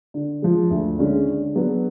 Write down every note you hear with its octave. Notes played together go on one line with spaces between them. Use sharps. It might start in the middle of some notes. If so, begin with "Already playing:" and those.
D3
F3 G#3
D2
D3 G#3 C#4
D3
F#3 B3 D4 G#4